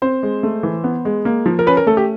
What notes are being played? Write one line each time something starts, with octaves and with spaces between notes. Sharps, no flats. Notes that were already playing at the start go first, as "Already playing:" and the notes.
C4 C5
G#3
A3
E3
B3
G#3
A#3
F3
A#4
C#4 B4
A#4
A3 A4
G4